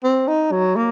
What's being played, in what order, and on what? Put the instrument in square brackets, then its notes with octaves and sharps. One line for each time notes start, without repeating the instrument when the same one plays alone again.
[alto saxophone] C4
D#4
F#3
A#3